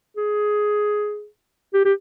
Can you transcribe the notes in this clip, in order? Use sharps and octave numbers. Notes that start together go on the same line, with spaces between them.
G#4
G4
G4